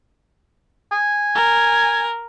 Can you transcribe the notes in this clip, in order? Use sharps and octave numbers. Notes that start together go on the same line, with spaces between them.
G#5
A#4